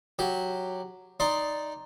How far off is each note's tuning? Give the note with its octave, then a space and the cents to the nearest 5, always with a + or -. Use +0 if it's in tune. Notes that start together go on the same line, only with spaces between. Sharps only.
F#3 +0 G4 +0
D#4 +0 D5 +0 C6 +0